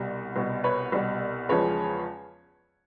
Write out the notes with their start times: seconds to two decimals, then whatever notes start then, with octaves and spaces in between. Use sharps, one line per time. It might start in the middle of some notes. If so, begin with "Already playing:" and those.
Already playing: C2 B2 G3
0.36 C2 B2 G3
0.64 B4 C#5
0.92 C2 B2 G3
1.49 E2 C#3 F3 G#3 B4 C#5